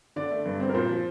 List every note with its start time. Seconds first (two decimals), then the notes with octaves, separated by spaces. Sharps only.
0.16 D3 D5
0.31 A3
0.46 G2
0.60 C4
0.69 A#4
0.75 A#2 C5
0.89 F3